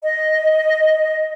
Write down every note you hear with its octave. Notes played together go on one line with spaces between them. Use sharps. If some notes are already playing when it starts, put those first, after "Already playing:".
D#5